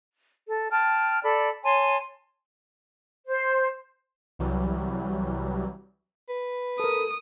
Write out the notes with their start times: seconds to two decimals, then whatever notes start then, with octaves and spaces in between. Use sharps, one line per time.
0.45 A4
0.71 G5 A5 F6
1.23 A4 D5 B5
1.64 C#5 G#5 A5 C6
3.27 C5
4.39 C2 E3 F#3 G3
6.29 B4
6.80 A4 A#4 D#6